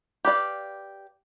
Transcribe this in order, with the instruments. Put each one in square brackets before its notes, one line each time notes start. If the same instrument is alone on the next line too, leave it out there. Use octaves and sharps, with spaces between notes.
[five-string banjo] G4 B4 D5 F5